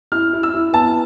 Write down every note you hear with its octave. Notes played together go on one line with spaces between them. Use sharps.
E4 F6
E4
E6
E4
B3 A5